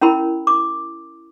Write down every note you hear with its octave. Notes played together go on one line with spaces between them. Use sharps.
C#4 E4 A#4 B5
D6